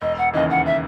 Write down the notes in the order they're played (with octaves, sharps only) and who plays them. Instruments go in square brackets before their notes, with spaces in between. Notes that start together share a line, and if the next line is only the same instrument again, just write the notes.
[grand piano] E1 [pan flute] D#5
[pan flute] F#5
[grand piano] D#2 C#3 E3 [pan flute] D#5
[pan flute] F#5
E5